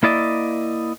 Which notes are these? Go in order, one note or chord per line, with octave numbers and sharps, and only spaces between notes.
A#3 E4 D5 D#5